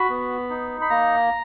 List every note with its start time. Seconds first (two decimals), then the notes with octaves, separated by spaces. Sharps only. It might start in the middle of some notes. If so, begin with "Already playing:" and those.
Already playing: F#4 B5
0.10 B3
0.50 D#4
0.81 B5
0.90 A#3 A#5